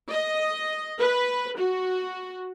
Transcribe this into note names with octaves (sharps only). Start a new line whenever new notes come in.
D#5
B4
F#4